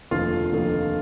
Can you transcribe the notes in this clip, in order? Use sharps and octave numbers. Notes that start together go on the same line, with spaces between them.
F1 D#2 D3 F3 F4
F1 D#2 D3 F3